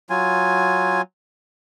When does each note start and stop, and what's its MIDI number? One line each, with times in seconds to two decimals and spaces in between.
0.10 1.02 54
0.10 1.02 65
0.10 1.02 80